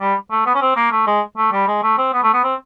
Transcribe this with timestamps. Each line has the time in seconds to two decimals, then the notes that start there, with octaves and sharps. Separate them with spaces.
0.01 G3
0.31 A3
0.46 B3
0.55 C#4
0.61 C4
0.76 A#3
0.92 A3
1.07 G#3
1.37 A3
1.52 G3
1.68 G#3
1.83 A3
1.98 C4
2.13 B3
2.23 A3
2.33 B3
2.44 C4